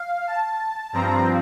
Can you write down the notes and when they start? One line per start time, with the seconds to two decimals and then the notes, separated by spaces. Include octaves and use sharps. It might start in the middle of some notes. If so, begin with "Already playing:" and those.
Already playing: F5
0.27 A5
0.93 G2 F3 C4 A#5